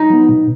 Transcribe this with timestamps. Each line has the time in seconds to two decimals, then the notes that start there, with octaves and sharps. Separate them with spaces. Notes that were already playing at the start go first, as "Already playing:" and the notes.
Already playing: D#4
0.10 F#3 B3
0.29 B2